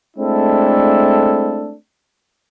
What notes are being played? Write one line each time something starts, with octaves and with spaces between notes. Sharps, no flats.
G#3 A3 C4 D4 E4 A4